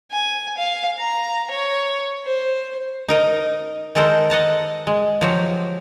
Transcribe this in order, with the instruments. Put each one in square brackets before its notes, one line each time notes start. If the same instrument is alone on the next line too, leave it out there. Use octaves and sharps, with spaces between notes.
[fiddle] G#5
F5
A#5
C#5
C5
[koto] D#4 A#4 D#5
D#3 G#3 A4 A#4 C5 F#5
D#5 F#5 A5 A#5
G#3
F3 F#3 G4